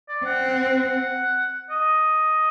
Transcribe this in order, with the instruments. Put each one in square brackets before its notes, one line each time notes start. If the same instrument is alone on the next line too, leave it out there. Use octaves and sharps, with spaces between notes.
[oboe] D5
[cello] C4 [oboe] F#5
[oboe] F#5
F#5
D#5